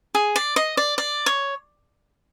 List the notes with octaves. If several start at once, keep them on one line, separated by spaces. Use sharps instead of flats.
G#4
D5
D#5
D5
D5
C#5